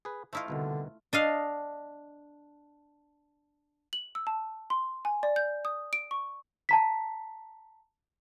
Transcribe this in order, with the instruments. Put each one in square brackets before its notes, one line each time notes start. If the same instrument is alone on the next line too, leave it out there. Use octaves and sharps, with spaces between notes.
[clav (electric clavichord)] G#4 B4
[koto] A3 E4 F4 [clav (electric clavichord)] C5 D#5 F5
[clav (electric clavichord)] C2 B2 D#3 [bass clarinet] D3
[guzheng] D4 D#5 F5
[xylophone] F#7
E6
A5
C6
G#5
D5
G6
D#6
D7
C#6
[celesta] A5 A#5 B6